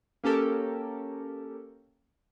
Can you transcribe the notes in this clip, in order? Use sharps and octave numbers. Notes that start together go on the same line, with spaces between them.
A#3 C#4 G4 A4 A#4